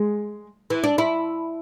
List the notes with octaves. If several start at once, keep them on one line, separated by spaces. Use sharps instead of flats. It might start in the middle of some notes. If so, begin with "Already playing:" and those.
Already playing: G#3
E3
D4
E4